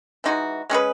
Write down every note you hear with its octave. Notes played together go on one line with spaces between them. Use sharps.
E3 G#3 D#4 F#4
G#3 C#4 G#4 B4